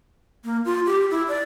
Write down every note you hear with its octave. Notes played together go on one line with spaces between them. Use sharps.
A#3
F4
G4
E4
D5